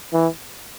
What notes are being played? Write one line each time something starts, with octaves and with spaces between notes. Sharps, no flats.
E3